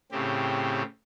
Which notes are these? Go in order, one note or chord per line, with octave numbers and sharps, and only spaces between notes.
A2 C#3 C4 G4